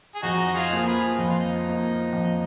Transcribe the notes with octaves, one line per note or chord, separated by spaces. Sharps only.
G#4
F2 D#4 F#4
F4 G#4
F3 A#3
G#4 B4
F2 D#4
F4
D#4
F3 A#3
F2